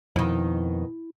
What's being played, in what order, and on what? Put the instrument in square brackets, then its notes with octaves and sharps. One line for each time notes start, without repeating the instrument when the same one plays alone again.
[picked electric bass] F2 [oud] B2 D#3 [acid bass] E4